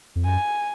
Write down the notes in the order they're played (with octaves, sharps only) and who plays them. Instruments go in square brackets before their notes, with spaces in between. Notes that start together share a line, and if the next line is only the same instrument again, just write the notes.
[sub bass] F2
[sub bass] F#2 [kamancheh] G#5